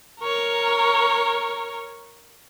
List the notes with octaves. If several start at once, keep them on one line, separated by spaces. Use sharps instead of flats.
A#4 C#5